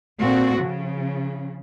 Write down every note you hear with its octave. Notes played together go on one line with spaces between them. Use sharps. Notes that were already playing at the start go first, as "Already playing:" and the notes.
A#2 C4 F#4 A4
C#3 F3